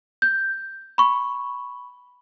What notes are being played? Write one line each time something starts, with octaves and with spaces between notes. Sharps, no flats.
G6
B5 C#6